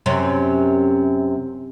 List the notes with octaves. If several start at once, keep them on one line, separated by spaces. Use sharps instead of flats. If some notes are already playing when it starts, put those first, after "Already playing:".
F#2 C3 C#4